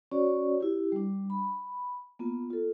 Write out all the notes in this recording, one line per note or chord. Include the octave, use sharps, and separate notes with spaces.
C#4 F#4 C#5 D5
E4 G4
G3 D4
B5
A#3 B3 F4
F4 A4